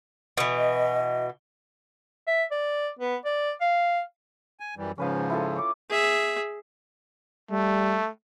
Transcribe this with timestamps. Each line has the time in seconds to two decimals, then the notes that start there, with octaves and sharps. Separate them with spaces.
0.38 B2 E3
0.55 D#5
2.27 E5
2.51 D5
2.99 B3
3.25 D5
3.61 F5
4.60 G#5
4.77 F#2 E3 G3
4.98 G#2 C#3 F3 C#4 B4 F5
5.30 E4 F4 A4
5.56 C#6 D6
5.90 G#4 E5
7.51 G3 A3